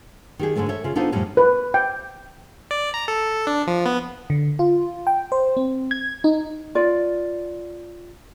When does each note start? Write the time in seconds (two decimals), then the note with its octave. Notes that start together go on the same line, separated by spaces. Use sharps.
0.39 D#3 G4 G#4
0.56 G#2 D3 G#3 A3 C#4
0.69 A4 C#5 E5
0.84 C#3 F4
0.95 B3 D4 D#4 F4 A4 C5
1.12 F2 A2 F3 G3 C#4
1.37 B4
1.74 G5
2.71 D5
2.94 A#5
3.08 A4
3.47 D4
3.67 F3
3.86 B3
4.30 D3
4.59 F4
5.07 G5
5.32 C5
5.57 C4
5.91 G#6
6.24 D#4
6.75 F4 D5